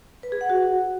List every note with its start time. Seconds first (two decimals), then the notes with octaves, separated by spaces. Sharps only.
0.23 B4
0.32 G#4
0.41 F#5
0.50 F#4